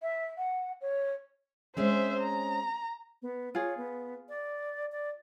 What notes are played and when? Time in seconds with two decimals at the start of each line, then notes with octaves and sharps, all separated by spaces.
0.02 E5
0.38 F#5
0.81 C#5
1.77 G#3 C4 C#4 C5 E5
2.20 A#5
3.22 B3
3.55 F4 G#4 C#5
3.77 B3
4.29 D5
4.92 D5